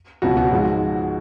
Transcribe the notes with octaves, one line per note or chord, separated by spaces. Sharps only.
C#2 B2 F#3 F#4
F#4
G#2 F3 G#3